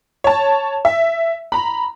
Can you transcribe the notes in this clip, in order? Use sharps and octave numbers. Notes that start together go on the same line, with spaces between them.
C#5 A5
E5
A#5 B5